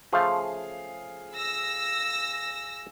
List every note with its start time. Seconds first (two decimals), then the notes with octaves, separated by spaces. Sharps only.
0.12 C#3 F3 A3 G#4 F5
1.35 E6 A#6